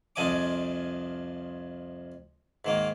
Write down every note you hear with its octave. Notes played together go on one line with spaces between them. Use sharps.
C2 F2 F3 D#5 G#5 D6
G#2 D#3 A#3